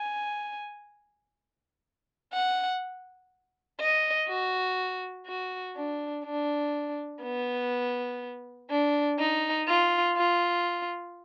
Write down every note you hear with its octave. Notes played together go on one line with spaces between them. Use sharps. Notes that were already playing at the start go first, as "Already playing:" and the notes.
Already playing: G#5
F#5
D#5
F#4
F#4
D4
D4
B3
D4
D#4
F4
F4